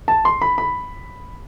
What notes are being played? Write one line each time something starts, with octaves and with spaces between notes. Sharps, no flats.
A5
C6
B5
B5